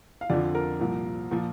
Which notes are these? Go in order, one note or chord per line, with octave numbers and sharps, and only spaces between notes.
F5
F2 D3 F3 D5
A#4
C2 A#2 F3
A#2 F3